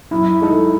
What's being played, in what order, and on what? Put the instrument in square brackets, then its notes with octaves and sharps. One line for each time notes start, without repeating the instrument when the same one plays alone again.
[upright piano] F#2 [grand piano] E4
[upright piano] D#3 G#3 D#4 A4